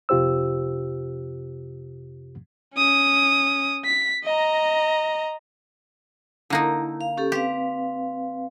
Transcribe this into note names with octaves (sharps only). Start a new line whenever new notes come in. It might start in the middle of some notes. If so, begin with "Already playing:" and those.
F2 C3 F4 G4 C5 E6
C#4 D#6
B6
D#5 A#5
D3 A#3 D#4 E4
F5
C#4 G4 A4
C4 G4 B4 F5